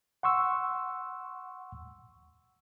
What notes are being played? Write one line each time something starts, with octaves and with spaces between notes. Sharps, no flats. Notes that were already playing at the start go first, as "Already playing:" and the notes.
F#5 C6 C#6 E6